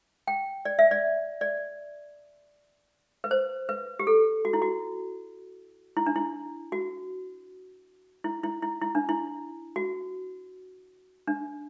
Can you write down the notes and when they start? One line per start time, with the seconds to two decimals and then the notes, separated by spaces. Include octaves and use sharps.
0.27 G5
0.65 D5
0.79 E5
0.91 D5
1.41 D5
3.24 B4
3.31 C5
3.69 B4
3.99 G4
4.07 A4
4.45 F#4
4.53 E4
4.62 F#4
5.97 E4
6.06 D4
6.16 E4
6.72 F#4
8.24 E4
8.44 E4
8.62 E4
8.82 E4
8.95 D4
9.09 E4
9.76 F#4
11.27 D4